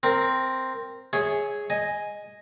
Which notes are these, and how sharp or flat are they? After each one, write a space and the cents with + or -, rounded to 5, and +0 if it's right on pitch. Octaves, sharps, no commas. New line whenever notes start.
C4 +0 A#4 +0
G#4 +0 C#5 +0 E5 -30
D#5 +0 G#5 +0